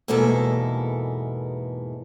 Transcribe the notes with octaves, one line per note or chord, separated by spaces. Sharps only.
E2 G#2 B2 A#3 E4 A4